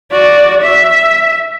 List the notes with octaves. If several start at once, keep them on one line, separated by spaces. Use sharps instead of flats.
F#4 D5
E5